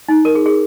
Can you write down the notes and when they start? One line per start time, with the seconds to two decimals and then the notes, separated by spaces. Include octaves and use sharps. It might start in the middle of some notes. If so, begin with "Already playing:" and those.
0.09 D#4
0.25 A#4
0.35 G#4
0.46 G#4